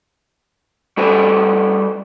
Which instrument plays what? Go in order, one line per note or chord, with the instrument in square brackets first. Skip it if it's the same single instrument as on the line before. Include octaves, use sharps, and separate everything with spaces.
[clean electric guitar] G3 F#4 A4 B4 C5 G#5